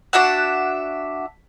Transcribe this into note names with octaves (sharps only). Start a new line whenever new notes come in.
D4 F#4 E5 F#5